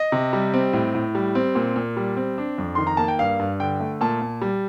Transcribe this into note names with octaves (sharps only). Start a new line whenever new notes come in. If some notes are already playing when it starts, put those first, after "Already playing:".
Already playing: D#5
C3
G3
C4
A2
A2
G3
C4
A#2
A#2
G3
C4
D4
F2
D#3 C6
A#5
A#3 A5
G5
G2 F5
G2
D3 G5
A3
A#2 A5
A#2
G3